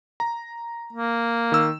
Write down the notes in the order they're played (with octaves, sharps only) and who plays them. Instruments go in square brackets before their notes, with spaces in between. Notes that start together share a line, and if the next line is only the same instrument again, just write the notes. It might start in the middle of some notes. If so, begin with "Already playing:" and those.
[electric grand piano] A#5
[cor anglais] A#3
[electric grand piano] D#3 E6